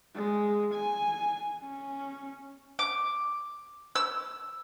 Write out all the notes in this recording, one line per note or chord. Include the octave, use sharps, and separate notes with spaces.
G#3
G#5
C#4
D6
E6